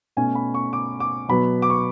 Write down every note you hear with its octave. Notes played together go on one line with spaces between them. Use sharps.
B2 A3 C#4 G#5
B5
C#6
D6
D6
B2 F#3 B3 B5
D6
C#6